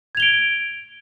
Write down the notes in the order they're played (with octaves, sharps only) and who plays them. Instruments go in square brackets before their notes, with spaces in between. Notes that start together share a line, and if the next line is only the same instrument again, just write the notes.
[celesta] G#6
F7
G7
D7